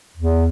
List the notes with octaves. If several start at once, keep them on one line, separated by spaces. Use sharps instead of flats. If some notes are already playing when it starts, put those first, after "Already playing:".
E2